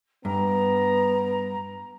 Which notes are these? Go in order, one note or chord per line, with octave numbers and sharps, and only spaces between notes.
G2 B3 A#5